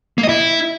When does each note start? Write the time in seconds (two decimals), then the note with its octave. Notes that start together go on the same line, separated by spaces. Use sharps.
0.18 A#3
0.23 D#5
0.29 E4